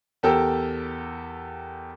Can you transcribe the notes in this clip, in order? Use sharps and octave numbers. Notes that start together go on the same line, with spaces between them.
E2 G4 A4 A#4 G5 E6